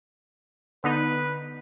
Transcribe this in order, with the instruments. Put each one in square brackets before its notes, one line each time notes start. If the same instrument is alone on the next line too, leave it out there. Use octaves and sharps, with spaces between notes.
[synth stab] D3 B3 D#4 [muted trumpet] B4